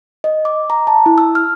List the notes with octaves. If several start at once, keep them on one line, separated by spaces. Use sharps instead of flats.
D#5
D6
A#5
A5
E4
E6
F6